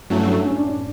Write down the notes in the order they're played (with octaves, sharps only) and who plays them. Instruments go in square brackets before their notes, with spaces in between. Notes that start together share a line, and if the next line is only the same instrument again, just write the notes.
[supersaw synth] G2 F#3 A3 [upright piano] C#4 E4
[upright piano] D4
C#4
D4
D4